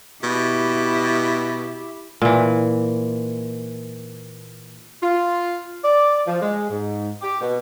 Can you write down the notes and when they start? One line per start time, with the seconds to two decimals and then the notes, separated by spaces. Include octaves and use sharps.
0.23 B2 E4 G4
2.22 A#2 E3
5.02 F4
5.83 D5
6.27 F3
6.42 G#3
6.70 G#2
7.22 G4
7.41 B2